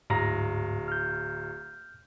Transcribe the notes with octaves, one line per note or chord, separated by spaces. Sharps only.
D1 G#2 A#5 A#6
F6 G6